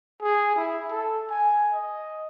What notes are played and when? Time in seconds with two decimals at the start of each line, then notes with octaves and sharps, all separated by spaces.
0.22 G#4
0.56 E4
0.91 A4
1.30 G#5
1.72 D#5